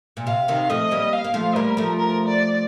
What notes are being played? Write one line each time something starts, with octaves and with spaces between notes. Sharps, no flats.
A#2
C3 F5
C3 D#3
F3 A3 D#5
G3 A#3
F5
A#3
F3 A3
G3 A#3 A#4
F3 A3
A#4
D5